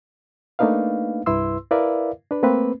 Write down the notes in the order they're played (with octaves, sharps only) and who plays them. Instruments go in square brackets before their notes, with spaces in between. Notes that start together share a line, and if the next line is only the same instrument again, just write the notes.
[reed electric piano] A3 A#3 D4 D#4 B4 F5
C2 G2 E4 B4 C6 E6
E4 A#4 B4 D5 E5 F5
D4 B4
A3 A#3 C4 B4